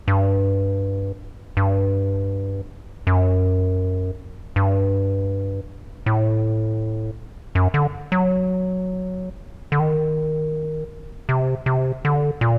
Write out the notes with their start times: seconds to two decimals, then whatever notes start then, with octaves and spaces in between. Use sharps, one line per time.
0.08 G2
1.57 G2
3.07 F#2
4.56 G2
6.06 A2
7.55 F#2
7.74 D3
8.12 F#3
9.72 D3
9.80 D#3
11.29 C3
11.66 C3
12.05 D3
12.41 A#2